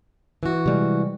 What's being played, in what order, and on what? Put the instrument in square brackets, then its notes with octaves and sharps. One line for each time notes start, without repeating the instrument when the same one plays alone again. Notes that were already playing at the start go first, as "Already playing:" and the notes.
[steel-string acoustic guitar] E3 F#4
[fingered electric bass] C3 G3 G#3